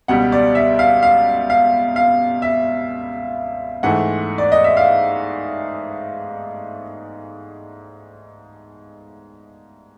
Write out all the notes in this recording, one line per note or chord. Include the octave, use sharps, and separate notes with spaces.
C#2 B2 G3 F#5
D5
E5
F5
F5
F5
F5
E5
G#2 E3 A3 F#5
D5
D#5
E5
F5